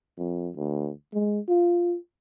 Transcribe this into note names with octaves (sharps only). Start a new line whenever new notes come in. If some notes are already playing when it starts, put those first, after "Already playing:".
F2
D2
G#3
F4